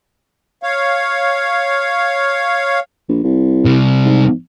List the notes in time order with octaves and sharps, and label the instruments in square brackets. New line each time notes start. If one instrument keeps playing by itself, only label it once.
[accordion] C#5 F5
[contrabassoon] A#1
C2
[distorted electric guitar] C3 G3
[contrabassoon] G#2